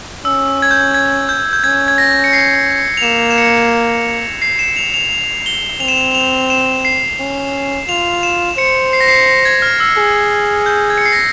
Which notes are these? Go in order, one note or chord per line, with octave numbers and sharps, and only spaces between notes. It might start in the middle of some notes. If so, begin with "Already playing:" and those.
C#4 E6
G#6
G6
G#6
G6
G6
C#4 G#6
G#6
A#6
C#7
C7
F7
A#3 E7
E7
C#7
C7
E7
F7
F7
F7
G7
C4 F7
E7
F7
F7
E7
C7
C#4
F4 F7
E7
C5 C#7
C7
A#6
C7
A#6
A#6
G#6
F6
E6
G#4
G6
G#6
C#7
C7
A#6